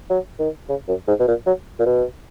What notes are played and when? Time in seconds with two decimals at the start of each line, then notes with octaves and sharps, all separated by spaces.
0.10 F#3
0.39 D#3
0.69 C#3
0.88 F#2
1.08 G#2
1.20 B2
1.28 A#2
1.46 F#3
1.79 A#2
1.86 B2